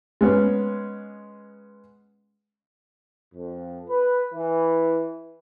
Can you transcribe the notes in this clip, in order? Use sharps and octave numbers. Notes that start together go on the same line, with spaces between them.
G#3 B3 C#4
F2
B4
E3